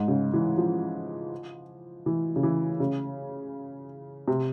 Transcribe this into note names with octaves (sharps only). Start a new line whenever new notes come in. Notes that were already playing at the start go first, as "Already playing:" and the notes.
Already playing: G#2
C#3
E3
F3
E3
C#3
E3
C#3
C3